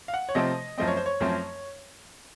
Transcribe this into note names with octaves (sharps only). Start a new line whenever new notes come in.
F5
F#5
C#5
C3 F3 A3 C4 D#5
F#2 F3 A3 C4 D#5
C#5
C5
C#5
F#2 F3 A3 C4